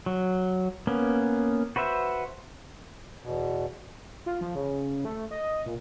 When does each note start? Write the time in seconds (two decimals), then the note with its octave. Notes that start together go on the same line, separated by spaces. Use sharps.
0.06 F#3
0.87 A#3 B3 C#4
1.76 F#4 B4 C5 E5
3.23 E2 B2
4.26 F4
4.41 F3
4.55 C#3
5.05 A3
5.31 D#5
5.66 A#2